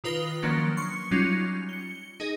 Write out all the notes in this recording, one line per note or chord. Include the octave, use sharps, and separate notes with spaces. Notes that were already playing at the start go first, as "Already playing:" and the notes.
D#3 F4 B4 D#6 A#6 G7
D#3 F3 F#3 A#3 C#4 D4
C6 C#6 C#7
F#3 G3 C#4 D#4 F4
C#7 G7
D#4 G#4 D#5